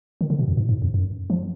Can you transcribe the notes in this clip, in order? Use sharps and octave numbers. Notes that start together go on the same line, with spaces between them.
D#3
D3
B2
F2
G#2
G#2
F2
F#2
F3